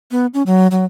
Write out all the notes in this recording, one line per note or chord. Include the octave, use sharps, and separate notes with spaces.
B3
C#4
F#3
F#3